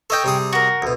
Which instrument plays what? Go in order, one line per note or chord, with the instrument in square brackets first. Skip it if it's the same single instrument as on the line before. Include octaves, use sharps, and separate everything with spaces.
[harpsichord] A4 D#5 [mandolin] C#5 E5 G5
[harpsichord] C3 G3 G#4
[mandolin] F#4 A#4
[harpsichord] D2 B2